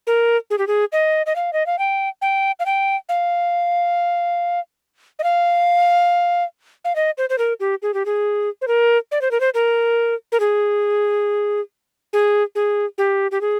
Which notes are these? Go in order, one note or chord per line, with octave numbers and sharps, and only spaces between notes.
A#4
G#4
G4
G#4
D#5
D#5
F5
D#5
F5
G5
G5
F5
G5
F5
D#5
F5
F5
D#5
C5
C5
A#4
G4
G#4
G4
G#4
C5
A#4
D5
C5
A#4
C5
A#4
A#4
G#4
G#4
G#4
G4
G4
G#4